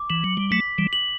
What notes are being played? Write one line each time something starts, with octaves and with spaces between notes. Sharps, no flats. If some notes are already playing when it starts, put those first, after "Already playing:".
Already playing: D6
E3 F#7
F#3
G3
F#3 A3 B6
E3 G3
F#7